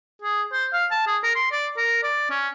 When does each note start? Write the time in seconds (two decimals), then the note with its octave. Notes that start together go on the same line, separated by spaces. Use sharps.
0.22 G#4
0.52 C5
0.73 F5
0.91 A5
1.07 G#4
1.23 A#4
1.35 C6
1.52 D5
1.77 A#4
2.03 D5
2.30 C#4